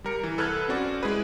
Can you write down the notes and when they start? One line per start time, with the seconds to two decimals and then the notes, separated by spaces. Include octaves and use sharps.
0.04 G3 A#4 C#7
0.23 E3
0.38 C2 A4 B4 F6 F#6 G#6
0.68 C4 C#4 F#4 D5
1.03 G#3 E4 G#4 B4